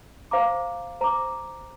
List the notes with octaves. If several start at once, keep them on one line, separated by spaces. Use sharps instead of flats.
C5 F5 A#5 D6
C5 A#5 D6